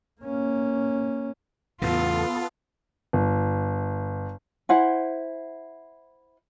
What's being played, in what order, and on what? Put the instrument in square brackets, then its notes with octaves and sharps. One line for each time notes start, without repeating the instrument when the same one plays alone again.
[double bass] A#3 C#4
[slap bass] E2 A2 C#3 [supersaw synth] B3 A4 A6 [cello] F4
[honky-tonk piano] G1
[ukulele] E4 C5 F#5 G#5